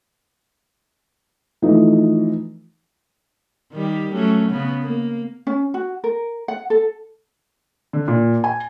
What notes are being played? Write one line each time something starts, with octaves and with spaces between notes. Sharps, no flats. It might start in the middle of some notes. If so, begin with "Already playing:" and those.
E3 F3 A3 D#4
D#3 G3 G4
F#3 A3 C#4
C#3 B3
A#3
C#4
F#4
A#4
F#5
A4
D3
A#2
G#5